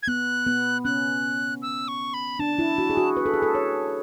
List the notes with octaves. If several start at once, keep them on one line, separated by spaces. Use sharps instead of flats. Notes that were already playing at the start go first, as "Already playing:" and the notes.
G#6
B3 F#6
B3
C#4 F#6
E6
C#6
B5
D4 A5
E4
F#4
G#4
F#4
B4
A4
G#4
A4
C#5